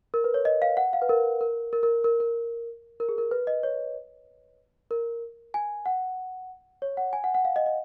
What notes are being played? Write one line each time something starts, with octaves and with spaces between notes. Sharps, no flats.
A#4
B4
C#5
D#5
F5
F#5
F5
B4
A#4
A#4
A#4
A#4
A#4
A#4
A#4
G#4
A#4
B4
D#5
C#5
A#4
G#5
F#5
C#5
F#5
G#5
F#5
F#5
F5
D#5
D#5